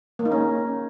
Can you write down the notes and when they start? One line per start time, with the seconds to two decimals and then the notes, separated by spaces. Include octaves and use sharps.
0.19 A#3
0.25 D#4
0.32 C#4